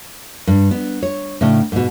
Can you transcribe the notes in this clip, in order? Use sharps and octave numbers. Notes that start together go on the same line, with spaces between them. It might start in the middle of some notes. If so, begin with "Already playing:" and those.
G2
B3
C#5
A2 C#3 D4
G#2 B2